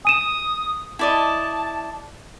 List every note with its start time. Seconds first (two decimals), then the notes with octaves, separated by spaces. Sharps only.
0.05 G#5 D#6 D#7 E7
0.99 E4 D5 D#5 A5